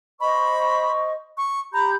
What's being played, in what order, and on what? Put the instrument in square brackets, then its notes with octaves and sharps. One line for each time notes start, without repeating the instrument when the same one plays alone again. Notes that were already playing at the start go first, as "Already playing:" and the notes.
[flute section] C5 D#5 C#6 [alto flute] B5
[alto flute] C#6
[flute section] G4 B5 G6 [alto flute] A#5